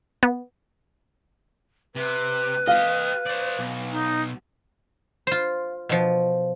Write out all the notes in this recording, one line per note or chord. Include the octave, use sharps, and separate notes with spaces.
B3
C3 B4
G4 D#5 F5
C5 D5
B1
D#4
F4 C5
B2 F3